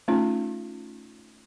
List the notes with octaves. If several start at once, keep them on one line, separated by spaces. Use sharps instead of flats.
A3 C#4 D#4 F4